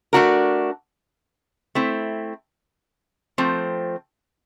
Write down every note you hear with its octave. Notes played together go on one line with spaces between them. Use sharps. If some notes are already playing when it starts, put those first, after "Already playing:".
A3 D4 F#4 A#4
A3 C4 E4
F3 A3 C4